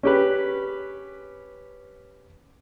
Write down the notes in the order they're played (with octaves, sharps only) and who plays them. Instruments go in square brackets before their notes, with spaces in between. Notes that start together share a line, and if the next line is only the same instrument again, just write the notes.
[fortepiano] C#4 G4 B4